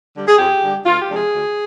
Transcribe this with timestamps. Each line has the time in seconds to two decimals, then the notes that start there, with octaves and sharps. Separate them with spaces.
0.16 D3 G3
0.28 G#4
0.39 F2 G4
0.62 D3 G3
0.86 D2 F4
1.01 G4
1.09 C3 F3 G#3 D4
1.17 G#4
1.33 D2